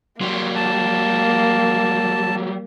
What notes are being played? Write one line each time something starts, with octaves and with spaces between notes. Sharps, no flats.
F#3 G3 A#3 C6
A5